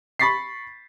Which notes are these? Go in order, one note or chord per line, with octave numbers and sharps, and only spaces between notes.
B5 C#6 A6 B6 C7